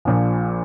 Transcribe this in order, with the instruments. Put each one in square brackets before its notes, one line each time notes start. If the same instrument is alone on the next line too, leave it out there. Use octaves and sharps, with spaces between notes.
[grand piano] A#1 A#2 F3